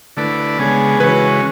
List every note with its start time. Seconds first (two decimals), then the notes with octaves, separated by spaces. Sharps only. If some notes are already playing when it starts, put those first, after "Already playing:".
0.17 D3 A3 E4 B4 D5
0.58 C#3 G#3 B3 D4 G#4
1.00 C#3 E3 G#3 C#4 F#4 B4